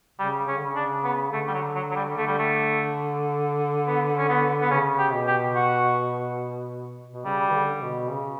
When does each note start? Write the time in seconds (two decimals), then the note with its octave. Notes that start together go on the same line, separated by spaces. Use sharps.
0.19 C#3 G3
0.47 C#3 C#4
0.57 D3
0.66 C#3
0.75 D4
1.04 B3
1.32 D3 A3
1.47 G3
1.54 F#3
1.75 F#3
1.91 F#3
1.96 G3
2.17 D3 A3
2.27 G3
2.39 A3
3.87 B3
4.17 C#4
4.29 B3
4.61 B3
4.71 C#3 C#4
4.98 G4
5.13 B2
5.27 G4
5.55 F#4
7.13 B2
7.25 C#3 G3
7.50 E3
7.53 D3
7.82 B2
8.10 C#3